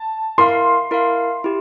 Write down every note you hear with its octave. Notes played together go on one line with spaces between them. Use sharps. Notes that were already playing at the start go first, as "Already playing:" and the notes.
Already playing: A5
E4 A#4 F5 C6
E4 A#4 F5
E4 G4